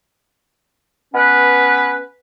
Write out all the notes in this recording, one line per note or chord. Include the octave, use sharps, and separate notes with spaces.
B3 C#4 B4